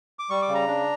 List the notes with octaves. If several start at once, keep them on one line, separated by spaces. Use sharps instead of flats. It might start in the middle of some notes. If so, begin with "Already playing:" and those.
D6
G3 C#6
D6
C#3
A#5
D4